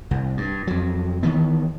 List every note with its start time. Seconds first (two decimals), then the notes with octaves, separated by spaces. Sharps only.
0.11 C2
0.37 G2
0.67 F2 F#3
1.23 D#3 E3 B3